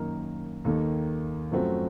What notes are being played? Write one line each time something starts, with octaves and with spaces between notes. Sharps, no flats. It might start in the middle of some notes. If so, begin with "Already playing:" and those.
Already playing: F#2 D#3 A#3 D#4 A#4
D#2 D#3 A#3 D#4 A4
F#2 F3 A3 C4 F#4